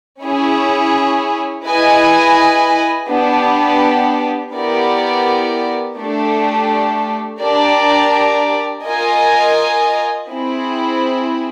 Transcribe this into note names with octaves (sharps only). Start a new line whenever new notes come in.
C#4 E4 G#4 C#5
E4 G#4 B4 D#5 G#5
B3 D4 G4
B3 E4 G4 A#4 D5
A3 D4 G4
D4 G4 A#4 D5
F4 A#4 D#5 G#5
C4 E4 G#4